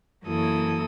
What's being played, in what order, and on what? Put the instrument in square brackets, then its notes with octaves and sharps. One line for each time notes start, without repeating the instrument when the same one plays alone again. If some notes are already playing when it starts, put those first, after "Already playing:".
[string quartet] F#2 E3 A#3 E4 A4 D#6